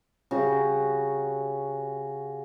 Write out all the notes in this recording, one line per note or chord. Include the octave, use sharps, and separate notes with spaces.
C#3 F#4 G4